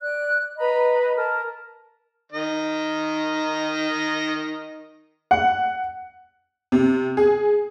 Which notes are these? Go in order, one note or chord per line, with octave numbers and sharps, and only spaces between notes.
D5 F#6
B4 D#5 A#5 B5
A#4 A5
D#3 D#5
F#5
C3
G#4